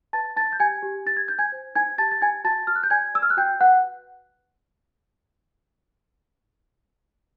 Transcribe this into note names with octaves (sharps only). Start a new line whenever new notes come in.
B4 A5 A6
D#4 A5 A6
G6
G4 G#5 G#6
G4
D#4 A6
G#6
D#4 G6
G#5 G#6
C5
D#4 G#5 G#6
G4 A5 A6
A6
D#4 G#5 G#6
F#4 A5 A6
F#4 F6
F#6
G6
D5 G#5 G#6
D5 E6
F6
F#6
F#4 G5 G6
B4 F#5 F#6